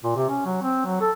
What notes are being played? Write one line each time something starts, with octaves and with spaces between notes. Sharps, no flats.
A#2
C3
C#4
F#3
C4
F#3
A4